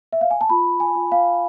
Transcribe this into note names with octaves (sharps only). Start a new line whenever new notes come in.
E5
F5
G#5
A5
F4 B5
G#5
F4
F5